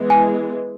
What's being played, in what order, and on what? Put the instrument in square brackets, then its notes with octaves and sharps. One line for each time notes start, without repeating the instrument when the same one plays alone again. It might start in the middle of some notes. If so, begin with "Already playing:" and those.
Already playing: [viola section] E3 G#3 B3
[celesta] G#5